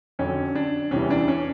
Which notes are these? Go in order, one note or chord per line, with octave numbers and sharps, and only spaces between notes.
F2 D3 F#3 C#4
D4
E2 C3 E3 G3 C#4
D4
C#4